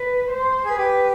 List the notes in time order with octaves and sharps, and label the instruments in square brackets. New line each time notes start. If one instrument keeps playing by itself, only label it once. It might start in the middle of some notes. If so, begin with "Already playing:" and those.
Already playing: [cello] B4
C5
[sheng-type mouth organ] G#4
[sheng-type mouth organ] G4 [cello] B4